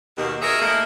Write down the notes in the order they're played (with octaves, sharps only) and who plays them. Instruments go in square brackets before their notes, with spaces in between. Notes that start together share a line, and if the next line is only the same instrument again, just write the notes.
[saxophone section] D#2 B2
G#4 A#4 C#5 D#5 E5
A3 A#3 D#4 E4